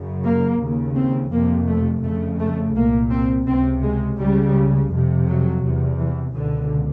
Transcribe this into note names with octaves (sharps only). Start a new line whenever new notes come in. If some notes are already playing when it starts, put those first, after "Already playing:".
Already playing: F#2 C#3
A#3
D#2 C#3
C4
F2 C3 A#3
A3
F2 C#3 A3
A3
C2 A#2 A#3
C4
C#2 C3 C4
G#3
C#2 C#3 G3
F2 C3
F#3
E2 C3
E3
C#2 B2 D3